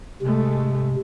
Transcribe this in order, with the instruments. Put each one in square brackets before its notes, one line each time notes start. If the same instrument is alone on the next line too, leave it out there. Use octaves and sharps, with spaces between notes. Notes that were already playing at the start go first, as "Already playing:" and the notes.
[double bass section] G#2 G#3 A3 [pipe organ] C3